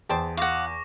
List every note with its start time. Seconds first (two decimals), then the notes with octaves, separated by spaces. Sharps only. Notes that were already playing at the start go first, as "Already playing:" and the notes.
0.09 E2 C5 G5 A5
0.37 F4 F5 F#5 C#6 D6 A#6